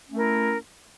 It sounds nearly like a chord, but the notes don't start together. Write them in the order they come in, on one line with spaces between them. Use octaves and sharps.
C#4 A3 A#4 E4